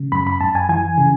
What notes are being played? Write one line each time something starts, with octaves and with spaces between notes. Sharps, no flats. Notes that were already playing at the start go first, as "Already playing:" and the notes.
Already playing: C#3
F#2 B5
B5
F#2 A5
G#5
E3 G#5
C#3